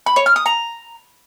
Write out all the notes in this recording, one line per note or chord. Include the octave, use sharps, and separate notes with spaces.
B5
C#5
F6
D#6
A#5